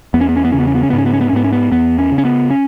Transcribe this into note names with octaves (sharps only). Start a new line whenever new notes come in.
E2 B3
C#4
B3
C#4
B3
C#3 C#4
B3
C#4
B3
C#4
B3
G#2
C#4
B3
C#4
B3
C#4
G#2 B3
C#4
B3
E2 B3
C#4
C#3
C#4
B3
C#4